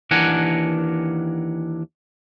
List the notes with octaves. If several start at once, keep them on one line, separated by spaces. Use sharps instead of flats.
D#2 E3 D4 A#4 F#5 G#5